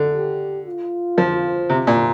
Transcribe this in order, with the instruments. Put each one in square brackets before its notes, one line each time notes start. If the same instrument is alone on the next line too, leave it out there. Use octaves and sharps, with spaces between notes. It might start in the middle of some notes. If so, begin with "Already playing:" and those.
Already playing: [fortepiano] D3
[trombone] G4
F4
[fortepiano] F3
C3
A#2